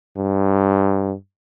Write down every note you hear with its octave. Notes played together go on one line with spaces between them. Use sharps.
G2